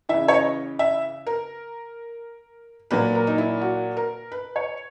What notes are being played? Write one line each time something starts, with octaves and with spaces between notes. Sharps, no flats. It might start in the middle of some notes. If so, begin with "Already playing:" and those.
C#3 E3 E5
C#5
D#5
E5
A#4
A#2 F#3 B4
A#4
D#4
E4
F#4
A#4
B4
C#5